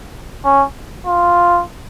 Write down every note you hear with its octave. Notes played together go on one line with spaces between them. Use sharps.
C#4
F4